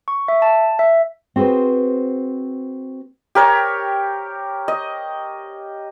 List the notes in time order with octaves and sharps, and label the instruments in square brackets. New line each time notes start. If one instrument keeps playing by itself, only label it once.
[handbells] C#6
E5
A5
E5
[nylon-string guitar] C4 F#4 G#4 B4 C5
[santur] G4 A#4 C#5
D#5